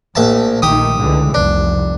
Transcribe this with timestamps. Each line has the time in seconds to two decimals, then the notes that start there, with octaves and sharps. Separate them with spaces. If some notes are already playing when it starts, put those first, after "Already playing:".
0.15 A#1 A2 E5 A5
0.62 A#1 D#3 A3 G4 D#6
0.99 C#2 D3 E3
1.34 F1 C2 D4